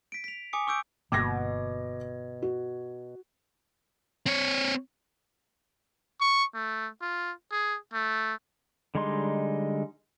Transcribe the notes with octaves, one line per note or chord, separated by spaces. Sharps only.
B6 D7
B6 F7
G#5 D6 D#6 C#7
C#6 D6 E6 G6 D7
G1 B2 A#3 D6 G#6 A#6
F#4
C4 C#5
C#6
A3
F4
G#4
A3
D3 G3 G#3 D#4 C6